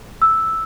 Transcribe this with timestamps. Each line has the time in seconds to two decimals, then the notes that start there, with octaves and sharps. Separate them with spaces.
0.22 E6